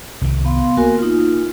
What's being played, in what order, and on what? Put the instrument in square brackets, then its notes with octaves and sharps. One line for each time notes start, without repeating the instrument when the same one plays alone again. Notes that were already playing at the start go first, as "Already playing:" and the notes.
[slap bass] C2 D#3
[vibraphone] B3 F5 C6
[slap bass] A#3 [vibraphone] F#4 A#4 G#5
[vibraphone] D#4 F4